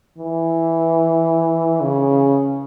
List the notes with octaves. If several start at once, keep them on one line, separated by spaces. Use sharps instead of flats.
E3
C#3